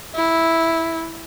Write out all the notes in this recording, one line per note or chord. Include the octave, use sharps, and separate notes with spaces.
E4